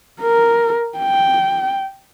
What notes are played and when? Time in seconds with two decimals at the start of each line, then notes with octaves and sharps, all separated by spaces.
0.22 A#4
0.98 G5